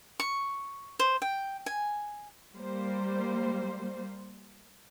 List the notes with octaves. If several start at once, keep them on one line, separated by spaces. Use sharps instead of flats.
C#6
C5
G5
G#5
G3 A#3 C5